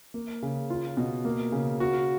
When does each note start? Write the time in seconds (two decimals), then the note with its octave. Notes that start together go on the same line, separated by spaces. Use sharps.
0.14 A#3
0.42 C#3
0.70 F4
0.97 B2
1.25 A#3
1.52 C#3
1.80 F#4